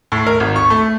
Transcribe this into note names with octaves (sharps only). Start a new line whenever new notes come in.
A2
A#4
G#1
C#6
A3